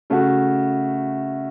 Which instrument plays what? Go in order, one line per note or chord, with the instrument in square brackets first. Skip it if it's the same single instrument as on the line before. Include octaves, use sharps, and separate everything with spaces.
[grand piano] C#3 A3 F#4